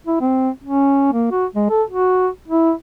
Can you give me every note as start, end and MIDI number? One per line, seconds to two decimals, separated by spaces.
0.07 0.19 64
0.21 0.50 60
0.64 1.09 61
1.13 1.29 58
1.31 1.46 66
1.55 1.67 56
1.70 1.83 69
1.90 2.28 66
2.48 2.73 64